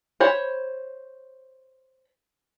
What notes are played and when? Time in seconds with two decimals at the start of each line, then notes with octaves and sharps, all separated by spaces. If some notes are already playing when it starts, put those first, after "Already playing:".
0.20 C5 C#5 B5